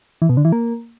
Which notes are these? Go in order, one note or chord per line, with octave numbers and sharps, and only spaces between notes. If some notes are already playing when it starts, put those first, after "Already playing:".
E3
B2
D3
E3
A#3